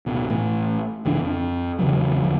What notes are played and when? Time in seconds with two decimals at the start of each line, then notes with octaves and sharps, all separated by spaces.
0.06 D1 B2
0.28 A1 A2
1.05 G1 C#2 E3 D4
1.20 F2
1.79 E2 C#3 E3 F#3
2.23 E2 D3 F3